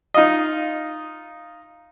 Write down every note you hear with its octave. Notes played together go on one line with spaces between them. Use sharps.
D#4 F4 D#5